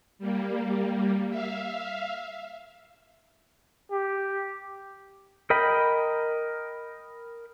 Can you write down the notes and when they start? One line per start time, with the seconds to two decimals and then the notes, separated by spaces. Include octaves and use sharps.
0.19 G3 A#3
1.29 E5 F5
3.91 G4
5.50 A#4 D#5 G5 B5